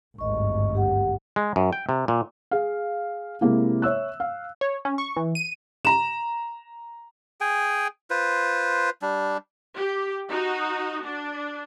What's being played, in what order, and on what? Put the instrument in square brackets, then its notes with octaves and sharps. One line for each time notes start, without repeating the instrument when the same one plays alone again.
[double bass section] G#1 D2 G2 [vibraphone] D#5 C#6
[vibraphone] G4 F#5
[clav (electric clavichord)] G#3
F#2
G5
C3
A#2
[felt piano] G#4 F5
C3 G#3 A#3 E4
C#5 E5 E6 F#6
F5
[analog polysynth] C#5
C#4
C#6
E3
D#7
[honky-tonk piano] A#5 E7
[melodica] G#4 G5 G#5
F4 B4 C5
G3 D4
[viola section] G4
D#4 F#4
D4